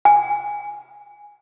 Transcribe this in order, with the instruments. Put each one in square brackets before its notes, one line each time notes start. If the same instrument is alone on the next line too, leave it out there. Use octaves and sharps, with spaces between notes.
[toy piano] G#5